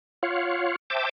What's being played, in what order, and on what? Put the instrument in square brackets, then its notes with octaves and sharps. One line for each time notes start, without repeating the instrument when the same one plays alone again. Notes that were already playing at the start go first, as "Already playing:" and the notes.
[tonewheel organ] F4 C#5 F5 F#5
C5 E5 G5 A5 D6